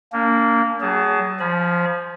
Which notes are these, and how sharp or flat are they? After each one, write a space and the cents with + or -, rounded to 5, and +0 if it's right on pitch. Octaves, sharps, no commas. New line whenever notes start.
A#3 -15 D4 -40
F#3 +35 G#4 +0 A5 +0
F3 +0 G#5 +35 B5 -35